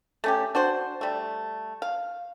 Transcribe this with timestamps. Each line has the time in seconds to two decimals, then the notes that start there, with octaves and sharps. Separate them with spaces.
0.24 A3 C#4 G4
0.55 D4 F#4 C5
1.01 G3 A3
1.82 F5